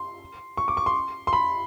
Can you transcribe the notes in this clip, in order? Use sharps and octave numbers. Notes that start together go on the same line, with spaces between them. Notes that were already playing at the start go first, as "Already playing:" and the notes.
Already playing: C6
C#6
D6
C#6
C6
C6
B5